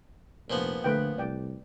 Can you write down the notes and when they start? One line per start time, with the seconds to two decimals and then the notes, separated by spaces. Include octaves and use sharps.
0.50 F1 A#2 F3 B3
0.84 D3 A3 B4 G5
1.18 C2 D5 G5